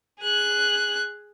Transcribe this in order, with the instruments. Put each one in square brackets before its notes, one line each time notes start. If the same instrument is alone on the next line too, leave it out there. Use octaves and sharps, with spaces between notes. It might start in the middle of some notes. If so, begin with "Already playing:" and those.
[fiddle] G#4 F#6